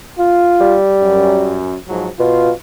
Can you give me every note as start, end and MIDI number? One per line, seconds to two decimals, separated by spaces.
0.17 0.77 65
0.60 1.60 55
1.02 1.75 42
1.88 2.10 44
1.88 2.10 53
1.88 2.10 54
2.19 2.51 47
2.19 2.51 65